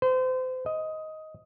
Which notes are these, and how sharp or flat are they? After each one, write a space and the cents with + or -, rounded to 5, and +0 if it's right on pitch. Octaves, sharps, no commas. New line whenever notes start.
C5 -35
D#5 +10